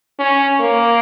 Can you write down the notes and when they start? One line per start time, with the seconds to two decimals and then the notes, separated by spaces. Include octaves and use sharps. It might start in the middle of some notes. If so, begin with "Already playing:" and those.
0.19 C#4
0.60 A#3